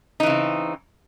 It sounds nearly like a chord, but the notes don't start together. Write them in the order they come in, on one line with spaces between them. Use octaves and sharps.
D#4 E3 C#3 C4